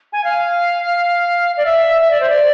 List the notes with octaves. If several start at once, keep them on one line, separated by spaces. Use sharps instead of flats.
G#5
F5
D5
E5
E5
D5
C5
D5